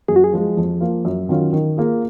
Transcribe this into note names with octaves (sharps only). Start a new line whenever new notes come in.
F#2 G#4
F#4
G#4
F3 G#3
F2
F3 A#3 F4
F#2
D#3 F#3 C#4 F4
D#3
A#3 F4 G#4